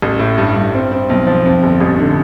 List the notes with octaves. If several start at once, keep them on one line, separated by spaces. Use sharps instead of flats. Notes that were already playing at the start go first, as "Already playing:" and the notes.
A1
A2
G2
G2
C4
C4
B1
F3
F2
G1
A1
D3